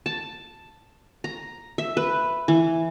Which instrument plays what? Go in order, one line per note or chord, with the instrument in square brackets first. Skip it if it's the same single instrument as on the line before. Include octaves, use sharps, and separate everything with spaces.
[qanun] A5
A#5
E5
B4
E3